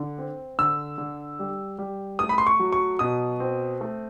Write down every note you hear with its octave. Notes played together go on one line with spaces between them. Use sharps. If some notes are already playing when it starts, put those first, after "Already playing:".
Already playing: D3
C4
D3 E6
D3
G3
G3
A3 D#6
B5
C6
C#6
F#3
C#6
B2 D#6
C4
A3